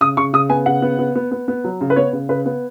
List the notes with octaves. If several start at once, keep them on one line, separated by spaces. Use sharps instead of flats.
C#3 D#6
C#3 C#6
C#3 D#6
B3 G#5
C#3 F#5
B3
B3
B3
B3
B3
F#3
C#3
B4
B3 C#5
C#3
C#3 B4
B3